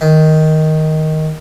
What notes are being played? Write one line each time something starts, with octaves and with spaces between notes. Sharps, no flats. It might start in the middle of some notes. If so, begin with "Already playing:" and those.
D#3